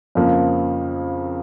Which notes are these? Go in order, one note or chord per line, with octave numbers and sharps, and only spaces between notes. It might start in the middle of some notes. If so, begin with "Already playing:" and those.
F2 C#3 F3 A#3